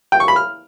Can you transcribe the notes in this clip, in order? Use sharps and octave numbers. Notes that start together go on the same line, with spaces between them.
G5
C#6
B5
F6